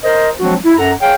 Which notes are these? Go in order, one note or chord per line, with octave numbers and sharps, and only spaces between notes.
A#4 C5 D#5
F3 F#3 G#3 C4 D4 F#4
E4
F#2 A4 F#5 A#5
G#4 C#5 F5 G5